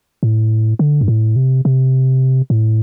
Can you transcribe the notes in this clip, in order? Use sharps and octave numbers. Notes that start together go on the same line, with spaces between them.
A2
D3
G2
A2
C3
C3
A2